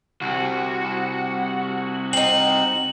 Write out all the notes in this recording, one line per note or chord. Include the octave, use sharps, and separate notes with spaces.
C2 F#4
C4 D#4 F#7